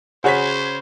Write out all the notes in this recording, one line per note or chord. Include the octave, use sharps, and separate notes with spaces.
C#3 F#4 G#4 C5 C#5 F#5 B6